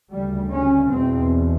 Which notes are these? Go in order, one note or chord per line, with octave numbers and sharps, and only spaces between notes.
D2 C#3 G3
C#4
E2 B2 C4